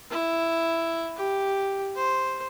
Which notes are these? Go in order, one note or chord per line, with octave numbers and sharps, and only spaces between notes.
E4
G4
C5